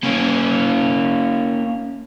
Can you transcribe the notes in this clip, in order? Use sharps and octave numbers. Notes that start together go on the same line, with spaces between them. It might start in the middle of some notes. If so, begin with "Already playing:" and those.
A#3 C#4